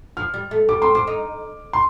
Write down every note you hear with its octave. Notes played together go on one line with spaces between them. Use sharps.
F3 F6
G3
A3
G3 D6
C4 C6
C4 D6
D#4
C6